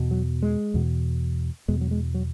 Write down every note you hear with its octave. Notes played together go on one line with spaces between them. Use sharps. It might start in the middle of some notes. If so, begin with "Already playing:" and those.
Already playing: E2 B2
F#3
G#3
E2 B2
E2 B2 G#3
F#3
G#3
F#3